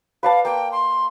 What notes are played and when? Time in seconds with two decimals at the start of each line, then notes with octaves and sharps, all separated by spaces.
0.23 B4 D5 F5 A5
0.45 A#3 G5
0.72 C6